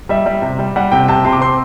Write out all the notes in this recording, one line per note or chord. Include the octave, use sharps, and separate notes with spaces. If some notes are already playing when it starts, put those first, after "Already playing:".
G3 E5
G3
C3
G3
G3 F#5
C3 G5
C3 A5
C3 C6
D6
C4 C6